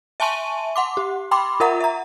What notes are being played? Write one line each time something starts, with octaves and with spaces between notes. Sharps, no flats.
E5 G#5 A5 C6 C#6 D#7
F#5 C6 D6
G4
G5 B5 C6 D6
F4 A#4 E5 F#5 A#5
E5 A#5